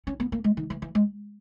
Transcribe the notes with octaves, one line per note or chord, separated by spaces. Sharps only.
C#4
B3
A#3
G#3
D#3
E3
E3
G#3